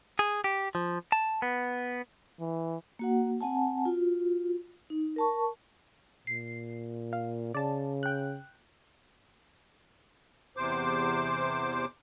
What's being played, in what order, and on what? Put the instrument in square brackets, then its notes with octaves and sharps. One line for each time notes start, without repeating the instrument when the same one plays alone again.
[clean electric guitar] G#4
G4
F3
A5
B3
[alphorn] E3
[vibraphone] A#3 F#4 F#5
C4 F#5 G#5 A5
F4 F#4
D#4
A#4 A5 C#6
[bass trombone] A#2 [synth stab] C7
[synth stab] F5
[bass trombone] C#3 [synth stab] D5 A5
[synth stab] G5 F#6
[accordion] E2 C3 C5 D6